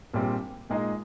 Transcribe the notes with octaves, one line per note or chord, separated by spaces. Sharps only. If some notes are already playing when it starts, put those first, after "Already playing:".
A#1 A#2 G3 C4
A#2 G#3 D#4 G#4